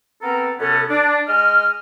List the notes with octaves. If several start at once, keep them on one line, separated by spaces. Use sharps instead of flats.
B3 C4 A4 A#4 A#5
F#2 C3 B3 C#4 A4
D4
G#3 D#5 F6